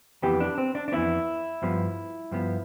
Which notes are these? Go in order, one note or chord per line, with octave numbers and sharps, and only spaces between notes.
F2 E3 B3 G4
D4
C4
D4
D4
F2 E3 B3 E4
G2 F3 B3
G2 F3 B3